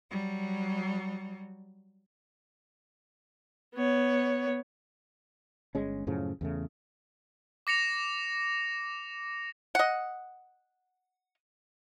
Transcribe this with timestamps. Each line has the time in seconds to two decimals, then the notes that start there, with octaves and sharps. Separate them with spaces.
0.10 F#3 G3
3.74 B3 C#5
5.75 G1 G#3 C#4
6.07 F#2 A2 C#3 F3
6.41 E2 C#3 A3
7.67 D6 A#6 C#7 F7
9.75 D#5 F#5